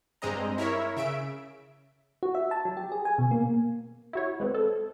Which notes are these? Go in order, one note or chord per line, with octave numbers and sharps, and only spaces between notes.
G2 G#3 C4 D#5 A#5
E4 A#4 C#5 E5
C#3 E5 D7
F#4
E5
A5
F#3
G4
G#4
G#5
B2
A#3
E4 F#4 C#5
G#3 B3 C4
A4